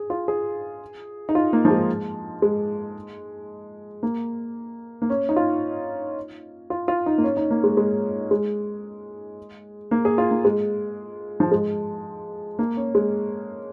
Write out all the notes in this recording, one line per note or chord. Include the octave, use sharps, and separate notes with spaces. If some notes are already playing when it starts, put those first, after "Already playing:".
Already playing: G#4
F4
G#4
D#4
F4
A#3
F3
G#3
G#3
A#3
A#3
C#4
D#4
F4
F4
F4
D#4
A#3
C#4
D#4
A#3
G#3
G#3
G#3
A#3
G#4
F4
A#3
G#3
F3
G#3
A#3
C#4
G#3